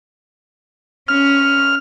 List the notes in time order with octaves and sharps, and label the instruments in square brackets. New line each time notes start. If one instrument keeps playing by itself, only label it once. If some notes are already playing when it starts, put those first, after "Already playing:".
[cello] C#4 [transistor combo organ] F6